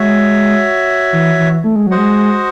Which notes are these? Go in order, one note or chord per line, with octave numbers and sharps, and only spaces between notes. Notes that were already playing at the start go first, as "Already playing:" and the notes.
Already playing: G#3 F#4 C#5 E5
E3
E3
A3
G#3
F#3 F#4 C5 D#5 F#5
G#3